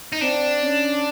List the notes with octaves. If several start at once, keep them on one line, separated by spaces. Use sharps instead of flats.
D#4
C4 D4
C#4